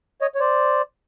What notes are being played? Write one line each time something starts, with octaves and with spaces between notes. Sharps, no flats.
C#5 D#5
C#5
C5 D5